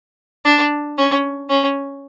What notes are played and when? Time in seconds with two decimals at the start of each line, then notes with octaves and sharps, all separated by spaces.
0.45 D4
0.98 C#4
1.49 C#4